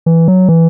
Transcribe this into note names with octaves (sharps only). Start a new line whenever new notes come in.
E3
F#3
E3